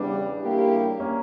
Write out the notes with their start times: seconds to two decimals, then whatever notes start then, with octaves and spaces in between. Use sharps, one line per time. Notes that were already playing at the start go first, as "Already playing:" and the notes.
Already playing: E2 C#3 G3 B3 D4
0.41 C#3 G3 A#3 E4 G4
1.00 A#3 C#4